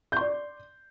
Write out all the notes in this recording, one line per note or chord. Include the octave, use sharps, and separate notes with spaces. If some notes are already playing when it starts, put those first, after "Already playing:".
D5 C6 G6